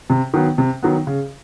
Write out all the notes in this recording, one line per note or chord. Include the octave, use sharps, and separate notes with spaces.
C3
D#3 F#3 B3
C3
D#3 F#3 B3
C#3